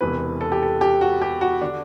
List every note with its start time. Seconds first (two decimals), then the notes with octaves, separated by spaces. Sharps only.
0.01 E1 E2 C3 E3 B4
0.41 A4
0.52 G4
0.63 A4
0.81 G4
1.01 F#4
1.22 G4
1.41 F#4
1.62 D3 D4